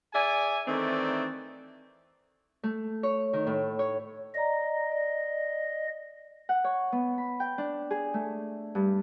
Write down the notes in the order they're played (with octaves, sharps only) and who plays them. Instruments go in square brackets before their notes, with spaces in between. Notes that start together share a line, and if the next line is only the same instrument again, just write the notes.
[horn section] G#4 D5 E5 G#5
D#3 E3 A3 C4 D#4 D5
[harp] A3
C#5
D#3
A2
C#5
[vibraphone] D5 A#5 [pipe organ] D#5
[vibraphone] D5
[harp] F#5
C#5
B3
B5
G5
D4
G#4
A3
G2